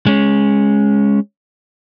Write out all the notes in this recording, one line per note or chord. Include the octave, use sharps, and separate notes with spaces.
G#3 C#4